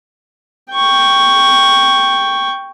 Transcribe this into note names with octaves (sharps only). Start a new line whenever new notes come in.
G5 C#6